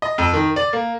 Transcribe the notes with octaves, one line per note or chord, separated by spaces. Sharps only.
D#5
F2
D#3
D5
A#3